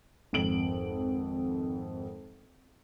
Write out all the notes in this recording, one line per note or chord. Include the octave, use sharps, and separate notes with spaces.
G#1 F2 D7 F#7